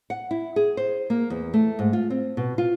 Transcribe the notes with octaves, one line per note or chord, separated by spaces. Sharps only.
F#5
E4
G#4
C5
A#3
E2
A3
G#2
F4
C4
B2
F4